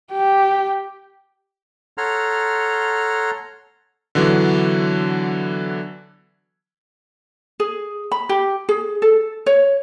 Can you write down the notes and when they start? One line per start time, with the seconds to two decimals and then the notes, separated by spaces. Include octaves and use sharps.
0.12 G4
1.98 A4 C#5 F#5 A#5 C6 F6
4.15 D3 E3 F#3 B3 D4
7.60 G#4
8.12 B5
8.29 G4
8.69 G#4
9.02 A4
9.46 C#5